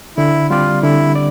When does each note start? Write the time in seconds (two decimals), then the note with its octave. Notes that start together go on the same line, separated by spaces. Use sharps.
0.17 D3 E4
0.50 G3 C4 F4 G4 D5
0.83 D3 E4
1.15 D5